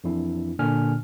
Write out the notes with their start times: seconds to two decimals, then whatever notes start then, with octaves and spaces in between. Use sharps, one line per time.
0.04 F2 E3 D4 E4
0.59 A#2 D3 A#3 D4 G#5 F6